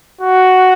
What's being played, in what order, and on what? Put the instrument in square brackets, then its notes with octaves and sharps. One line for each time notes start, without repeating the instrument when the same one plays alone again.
[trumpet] F#4